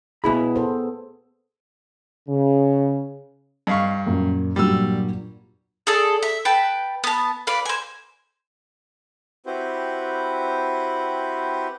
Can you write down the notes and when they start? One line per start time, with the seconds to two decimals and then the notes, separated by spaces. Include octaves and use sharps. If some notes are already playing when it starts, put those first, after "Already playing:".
0.24 B2 B3 E4 G#4 B5
0.56 A4 C5
2.28 C#3
3.67 G2 D#5 F5 C#6
4.06 F#2 A#2
4.56 G2 A#2 F#3 G3 E6
5.87 G#4 A4 D5
6.23 E5
6.45 B4 G5 A5
7.04 B3 A5
7.47 B4 D5 F5
7.66 C5 G#5
9.46 C4 E4 F#4 G4 B4 C5